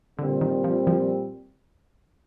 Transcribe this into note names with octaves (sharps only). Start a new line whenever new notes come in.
A#2 D3 G3 C4
D#3
F3
F3